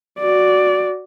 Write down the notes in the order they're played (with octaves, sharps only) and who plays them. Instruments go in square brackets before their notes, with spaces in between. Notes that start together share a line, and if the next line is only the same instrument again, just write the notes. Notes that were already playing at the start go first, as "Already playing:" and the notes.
[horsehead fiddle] F#4 D5